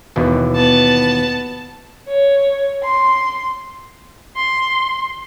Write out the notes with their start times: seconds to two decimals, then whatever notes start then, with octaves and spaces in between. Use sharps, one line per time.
0.16 D#2 B2 E3
0.55 B3 A5
2.08 C#5
2.83 C6
4.36 C6